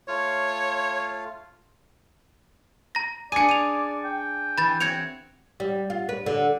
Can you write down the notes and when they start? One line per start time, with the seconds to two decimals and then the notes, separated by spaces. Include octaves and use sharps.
0.08 A3 F4 C#5 F5
2.95 A#5 A#6
3.32 D4 G#4 D5 G#5 C#7 D#7
3.49 D#7 F7
4.04 G5
4.58 E3 B5 A6
4.80 C4 F#4 C#5 G#6 C#7 F7
5.60 G3
5.90 F4
6.09 B4
6.26 D3